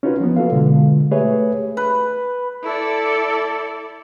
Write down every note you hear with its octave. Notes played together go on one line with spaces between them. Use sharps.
C#4 D#4 F4 F#4 B4
E3 F3 A#3 B3
F#4 A4 B4 F5
B2 D3 G#3 F4
A3 G4 G#4 B4 C#5 E5
B4
E4 A4 D5